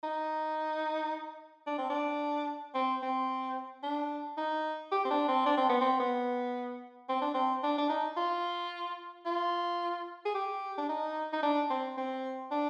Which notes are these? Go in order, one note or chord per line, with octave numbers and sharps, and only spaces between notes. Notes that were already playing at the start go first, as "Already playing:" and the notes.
D#4
D4
C4
D4
C4
C4
D4
D#4
G4
C4
D4
C4
D4
C4
B3
C4
B3
C4
D4
C4
D4
D4
D#4
F4
F4
G#4
G4
D4
D#4
D#4
D4
C4
C4
D4